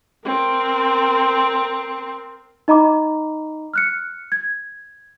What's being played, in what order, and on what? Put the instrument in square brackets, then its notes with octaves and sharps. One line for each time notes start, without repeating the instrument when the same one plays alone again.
[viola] C4 A#4
[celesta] D#4 D#5 A#5 B5 D6
F6 F#6 C#7
G#6